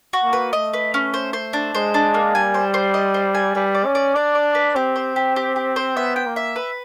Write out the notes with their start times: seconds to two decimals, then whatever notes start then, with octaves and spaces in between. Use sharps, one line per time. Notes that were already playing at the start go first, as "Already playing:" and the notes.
0.13 F#4
0.24 A#3
0.33 B4
0.53 A3 D#5
0.73 B4
0.94 C#4
1.14 C5
1.33 C5
1.53 D4
1.74 G#3 C5
1.94 D4
2.14 A#3
2.35 G3 G#5
2.54 C5
2.74 C5
2.94 D#5
3.14 C5
3.35 G#5
3.55 G3 B4
3.75 D5
3.85 C#4
3.95 D5
4.15 D4 D5
4.35 D5
4.55 B4
4.75 C4 G4
4.96 C5
5.16 G4
5.36 G4
5.56 G4
5.76 C5
5.96 B3 E5
6.16 G5
6.26 A#3
6.36 E5
6.56 B4